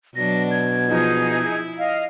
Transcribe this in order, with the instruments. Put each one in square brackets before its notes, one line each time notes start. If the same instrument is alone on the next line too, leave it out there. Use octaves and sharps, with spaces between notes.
[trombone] B2 [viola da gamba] F#3 D4 [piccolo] A#6
[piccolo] G#6
[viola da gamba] F3 [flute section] D#4 G#4
[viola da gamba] E4
[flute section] D#5 F5